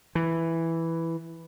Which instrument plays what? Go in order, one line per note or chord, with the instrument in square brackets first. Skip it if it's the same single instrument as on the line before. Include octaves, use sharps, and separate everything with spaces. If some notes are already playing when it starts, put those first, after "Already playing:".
[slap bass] E3